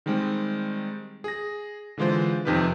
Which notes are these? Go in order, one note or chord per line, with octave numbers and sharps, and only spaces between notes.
D#3 G3 G#3 C4
G#4 A#6
D3 E3 G#3 F4 C5
F2 C3 D#3 G4 B4